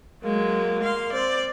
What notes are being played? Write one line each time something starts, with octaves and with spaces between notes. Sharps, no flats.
F#3 G#3 A#3
F5 C6
C4 D5